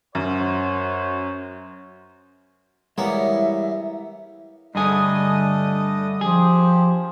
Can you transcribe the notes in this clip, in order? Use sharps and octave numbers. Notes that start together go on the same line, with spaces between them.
F#2 F#4 C5 C#5
E3 G3 G#3 A#3 B3 E4 C#5 E5
G2 D3 A3 D4 G#4 D#5 D#6
F3 G4 G#4